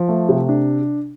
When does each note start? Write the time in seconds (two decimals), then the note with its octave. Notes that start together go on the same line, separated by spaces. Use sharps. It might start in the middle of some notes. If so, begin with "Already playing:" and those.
Already playing: F3
0.08 A3
0.29 C3
0.49 D4